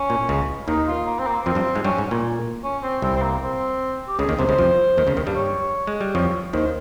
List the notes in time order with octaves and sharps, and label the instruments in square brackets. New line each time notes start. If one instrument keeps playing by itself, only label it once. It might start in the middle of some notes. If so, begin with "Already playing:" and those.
Already playing: [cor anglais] C#4
[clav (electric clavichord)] A#2
C#2 C#3
[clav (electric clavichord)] D#2 D#3 [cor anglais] D#4
[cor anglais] F4
A#3
C4
A#3
[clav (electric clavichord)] F2 F3 [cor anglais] C4
[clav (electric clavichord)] G2 G3
G#2 G#3
[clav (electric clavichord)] G2 G3 [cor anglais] C#4
[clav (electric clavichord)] G#2
A#2
[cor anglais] C#4
C4
[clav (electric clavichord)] C2 C3 [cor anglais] C4
[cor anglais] C4
A#3
C4
G4
[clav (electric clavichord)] C#2 C#3 [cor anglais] G#4
[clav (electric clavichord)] D#2 D#3
[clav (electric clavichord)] C2 C3 [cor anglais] C5
[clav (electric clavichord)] C#2 C#3
F2 F3
D#2 D#3
C#2 C#3
D#2 D#3
G2 G3
[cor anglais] C#5
[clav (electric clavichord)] G#3
G3
[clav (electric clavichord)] F2 F3 [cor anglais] C#5
[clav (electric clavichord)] D#2 D#3 [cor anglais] C5